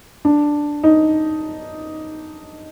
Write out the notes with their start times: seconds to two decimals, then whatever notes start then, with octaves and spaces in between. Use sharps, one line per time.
0.25 D4
0.84 D#4